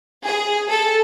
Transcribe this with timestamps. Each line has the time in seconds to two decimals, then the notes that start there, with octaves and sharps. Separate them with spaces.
0.24 G#4
0.69 A4